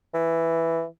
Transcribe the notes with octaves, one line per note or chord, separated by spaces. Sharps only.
E3